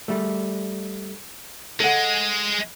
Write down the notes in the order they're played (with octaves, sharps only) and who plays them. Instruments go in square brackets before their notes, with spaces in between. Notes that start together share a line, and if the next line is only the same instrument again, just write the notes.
[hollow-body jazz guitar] G3 A3
[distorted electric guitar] G#3 [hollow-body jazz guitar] A4 F#5